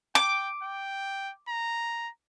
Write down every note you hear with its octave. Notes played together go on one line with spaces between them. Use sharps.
G5 D6
G5
A#5